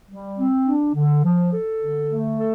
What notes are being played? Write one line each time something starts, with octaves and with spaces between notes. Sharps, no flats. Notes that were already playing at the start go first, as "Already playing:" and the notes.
G3
C4
D4
D3
F3
A4
D3
A3
A4